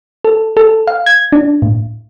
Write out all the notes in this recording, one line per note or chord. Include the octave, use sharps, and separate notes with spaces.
A4
A4
F5
G#6
D4
A2